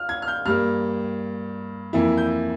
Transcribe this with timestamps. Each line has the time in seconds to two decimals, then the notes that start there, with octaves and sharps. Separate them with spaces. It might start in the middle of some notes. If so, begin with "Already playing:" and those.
Already playing: F4 F6
0.09 G#6
0.22 F6
0.28 G6
0.45 G2 G3 A#3 F6
1.93 F2 E3 A#3 E4
2.17 G6